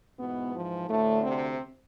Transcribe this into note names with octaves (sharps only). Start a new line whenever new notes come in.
G#2 B2 E3 B3
F3
D2 A2 D3 A3
C3 C4